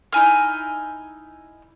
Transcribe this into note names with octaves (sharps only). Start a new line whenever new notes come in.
D#4 E4 G#5 F6